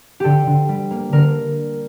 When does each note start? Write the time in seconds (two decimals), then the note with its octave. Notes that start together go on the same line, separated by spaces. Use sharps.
0.20 D3 G4 A4
0.47 D3
0.69 G3
0.91 A#3
1.12 D3 A#4